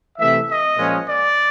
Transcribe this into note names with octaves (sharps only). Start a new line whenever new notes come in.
C3 E3 A3 E5
D#5
A#2 F3 G#3 C#4
D5